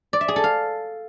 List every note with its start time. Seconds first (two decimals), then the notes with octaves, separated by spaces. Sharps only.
0.13 D5
0.21 E5
0.28 G#4
0.36 A4
0.44 F5